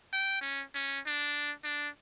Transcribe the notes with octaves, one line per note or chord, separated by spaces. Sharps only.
G5
C#4
C#4
D4
D4